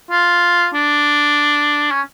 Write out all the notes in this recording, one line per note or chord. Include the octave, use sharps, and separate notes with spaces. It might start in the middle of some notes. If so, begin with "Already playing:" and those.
F4
D4
C#4